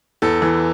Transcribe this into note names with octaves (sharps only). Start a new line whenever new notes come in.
E2 A4
E3